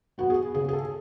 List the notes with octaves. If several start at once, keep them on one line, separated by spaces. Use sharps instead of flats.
F#3 B3 F#4
G#4
C#3 G#4
G#4
A4